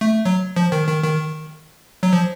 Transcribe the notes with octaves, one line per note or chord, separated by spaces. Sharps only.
A3
F#3
F3
D#3
D#3
D#3
F#3
F3